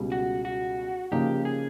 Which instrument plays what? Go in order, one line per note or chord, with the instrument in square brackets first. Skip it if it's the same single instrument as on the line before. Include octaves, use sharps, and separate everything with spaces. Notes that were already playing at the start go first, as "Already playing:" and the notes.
Already playing: [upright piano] C#2 B2 G3
[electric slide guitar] F#4
F#4
[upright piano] C#3 F3 A#3 D#4 [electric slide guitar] G4
[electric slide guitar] G#4